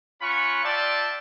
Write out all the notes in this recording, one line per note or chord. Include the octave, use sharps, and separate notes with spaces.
C#4 F4 F#5 B5 C#6
F4 D5 E5 G5 A5